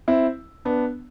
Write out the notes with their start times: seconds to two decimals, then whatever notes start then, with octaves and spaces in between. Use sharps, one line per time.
0.08 C4 E4
0.65 B3 D4